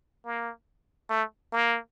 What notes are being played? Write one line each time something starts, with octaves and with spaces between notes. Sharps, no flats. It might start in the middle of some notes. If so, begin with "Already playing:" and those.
A#3
A3
A#3